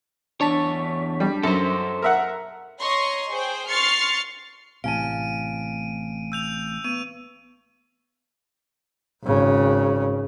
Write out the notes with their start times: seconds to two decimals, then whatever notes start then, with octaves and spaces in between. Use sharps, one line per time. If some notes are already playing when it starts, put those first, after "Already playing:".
0.41 E2 D4 C#5 A5 B6
1.20 G3
1.43 F#2 A4 C5
2.02 A#4 E5 F#5
2.80 C#5 D#5 A#5 C6 C#6
3.29 G#4 C5 G5
3.68 C6 C#6 F6 A6 C7 C#7
4.84 A1 A2 C3 F5 G#5 A5 D7 D#7
6.32 E6 G6 F7
6.84 B3 D#7
9.24 G#1 C#3